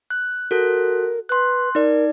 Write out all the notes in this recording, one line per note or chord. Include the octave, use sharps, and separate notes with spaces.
F#6
F#4 A4 A#4 F#6
B4 C6 F#6
D#4 A#4 D5